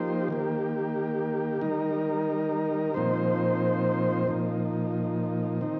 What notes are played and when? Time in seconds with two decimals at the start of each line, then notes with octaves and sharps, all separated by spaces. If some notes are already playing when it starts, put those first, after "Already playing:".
Already playing: F3 A#3 D#4 G4 C5
0.28 D#3 A#3 G4
1.61 D#3 G3 D#4 A#4
2.94 A#2 F3 C4 D#4 C5
4.28 A#2 F3 D#4
5.61 D#3 C4 D#4